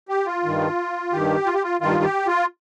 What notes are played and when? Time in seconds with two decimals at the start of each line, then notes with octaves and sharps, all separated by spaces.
0.09 G4
0.26 F4
0.44 G2 D#3
1.12 G2 D#3 G4
1.46 F4
1.54 G4
1.63 F4
1.81 G2 D#3 F4
2.03 G4
2.27 F4